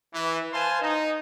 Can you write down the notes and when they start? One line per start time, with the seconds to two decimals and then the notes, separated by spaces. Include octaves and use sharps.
0.14 E3
0.53 B4 C5 F5 G#5 A5 C6
0.82 D#4